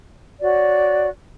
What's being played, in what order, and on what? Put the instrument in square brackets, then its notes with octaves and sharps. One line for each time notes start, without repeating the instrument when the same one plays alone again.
[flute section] F#4 C#5 D5